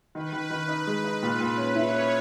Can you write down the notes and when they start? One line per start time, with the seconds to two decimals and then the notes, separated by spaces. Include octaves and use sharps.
0.14 D#3 B4
0.33 D#3
0.51 D#3
0.68 D#4
0.87 G#3
1.04 D#4
1.22 A#2
1.40 A#2
1.57 C#4
1.75 E4 C#5
1.94 C#4